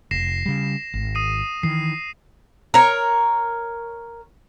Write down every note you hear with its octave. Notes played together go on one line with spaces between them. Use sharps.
F1 A#6 C7 E7
C#3 G3
G#1
D#6 C7 D#7
D#3 E3 C7
A#4 C#5